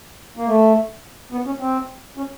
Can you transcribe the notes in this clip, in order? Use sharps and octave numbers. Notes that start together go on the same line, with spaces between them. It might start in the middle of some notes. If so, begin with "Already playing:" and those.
A#3
A3
B3
C#4
C4
C#4